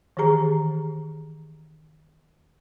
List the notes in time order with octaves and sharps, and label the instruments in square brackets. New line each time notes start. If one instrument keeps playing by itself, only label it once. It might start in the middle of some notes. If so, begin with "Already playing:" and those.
[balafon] D#3 E3 G4 G#4 A#5